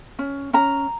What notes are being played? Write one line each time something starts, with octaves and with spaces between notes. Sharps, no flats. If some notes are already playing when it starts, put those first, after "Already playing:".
C#4
C#4 A#5